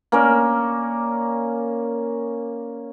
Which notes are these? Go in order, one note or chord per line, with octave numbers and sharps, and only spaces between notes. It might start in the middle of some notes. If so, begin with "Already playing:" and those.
A#3 C#4 D5